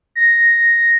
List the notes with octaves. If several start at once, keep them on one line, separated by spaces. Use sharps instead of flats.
A#6